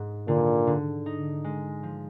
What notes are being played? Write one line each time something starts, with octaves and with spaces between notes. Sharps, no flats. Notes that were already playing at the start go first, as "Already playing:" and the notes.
Already playing: G#2
A#2 D3
D3
D#4
G#3
F3